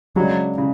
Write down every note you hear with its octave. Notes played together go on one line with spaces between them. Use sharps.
C#3 F#3 G#3 D4
C#3